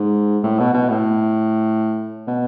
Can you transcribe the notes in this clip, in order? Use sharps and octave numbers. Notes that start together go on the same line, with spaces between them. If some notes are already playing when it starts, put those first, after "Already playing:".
Already playing: G#2
A2
B2
B2
A2
B2